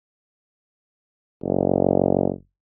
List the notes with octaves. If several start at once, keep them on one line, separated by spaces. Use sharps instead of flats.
F#1